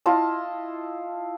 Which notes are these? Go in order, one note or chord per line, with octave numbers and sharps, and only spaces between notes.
E4 F4 D#5 A5